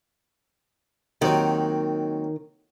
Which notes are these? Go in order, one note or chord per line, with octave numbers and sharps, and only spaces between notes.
D#2 D#3 F#3 C4